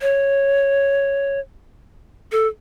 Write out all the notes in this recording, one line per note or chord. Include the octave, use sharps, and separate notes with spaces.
C#5
A4